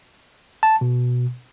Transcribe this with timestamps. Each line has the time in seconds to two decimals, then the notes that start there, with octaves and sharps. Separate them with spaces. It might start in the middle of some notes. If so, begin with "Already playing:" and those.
0.63 A5
0.81 B2